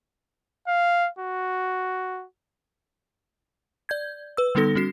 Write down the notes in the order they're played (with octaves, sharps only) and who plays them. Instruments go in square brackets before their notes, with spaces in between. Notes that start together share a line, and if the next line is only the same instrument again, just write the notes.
[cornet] F5
F#4
[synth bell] D5 G6 G#6
B4 E6
D3 G3 B3 D#4 A4 A#6
G3 C#4 F#4 C7